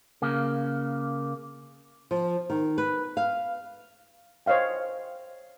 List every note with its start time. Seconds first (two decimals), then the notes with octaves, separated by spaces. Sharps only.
0.22 C#3 A#3
2.11 F3
2.50 D#3
2.78 B4
3.17 F5
4.46 C5 C#5 D#5 F5 G5